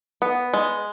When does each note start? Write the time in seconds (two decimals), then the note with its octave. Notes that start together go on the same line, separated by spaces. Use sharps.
0.22 B3
0.54 G#3